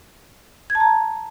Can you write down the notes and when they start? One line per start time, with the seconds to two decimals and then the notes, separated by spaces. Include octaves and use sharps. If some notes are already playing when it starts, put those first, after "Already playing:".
0.70 G#6
0.75 A5
0.80 A#5